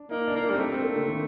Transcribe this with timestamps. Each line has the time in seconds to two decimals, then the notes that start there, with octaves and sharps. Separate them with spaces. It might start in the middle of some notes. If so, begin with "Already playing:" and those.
Already playing: D4
0.11 A#3 D#4
0.28 D4
0.36 A#3
0.44 D#4
0.50 G3 C4
0.59 A3 D4
0.72 C4
0.84 A#3
0.96 D3
1.08 D#3